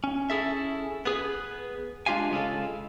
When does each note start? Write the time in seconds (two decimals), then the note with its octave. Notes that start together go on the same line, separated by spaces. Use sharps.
0.04 C#4
0.30 C#4 E4 G#4 A4 E5
1.05 B3 G#4 B4
2.06 G#3 D4 F4 G4 F5 G#5
2.31 C#3 G#3 F4 A4